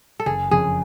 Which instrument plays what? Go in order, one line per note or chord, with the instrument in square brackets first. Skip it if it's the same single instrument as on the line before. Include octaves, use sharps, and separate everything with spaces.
[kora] A4
[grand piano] F#1 [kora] G#4
[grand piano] F2 C#3 [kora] G#4